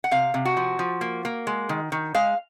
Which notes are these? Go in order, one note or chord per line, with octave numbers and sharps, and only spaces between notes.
F#5
C3 F5
C3
F#4
F3
F3
A#3
A#3
G#3
D#3
D#3
G#3 F5